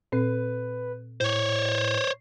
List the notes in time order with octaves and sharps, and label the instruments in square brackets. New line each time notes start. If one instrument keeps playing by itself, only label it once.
[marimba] A#2 C4 [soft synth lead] B4
[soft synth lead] A2 [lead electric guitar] C5 C#5